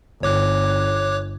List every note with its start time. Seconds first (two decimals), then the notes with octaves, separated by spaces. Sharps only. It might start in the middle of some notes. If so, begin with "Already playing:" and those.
0.23 G1 C#5 D6 F#6